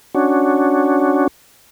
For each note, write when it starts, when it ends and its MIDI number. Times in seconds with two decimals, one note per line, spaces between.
0.15 1.27 61
0.15 1.27 62
0.15 1.27 66